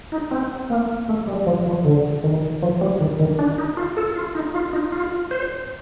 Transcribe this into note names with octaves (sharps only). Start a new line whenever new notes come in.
D#4
C4
A#3
A3
G3
F3
F3
D3
D#3
F3
G3
D#3
D#3
D4
D#4
F4
A4
F4
D#4
F4
D#4
F4
C5